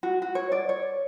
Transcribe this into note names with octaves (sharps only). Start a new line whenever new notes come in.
F#4
F#4
C#5
D5
C#5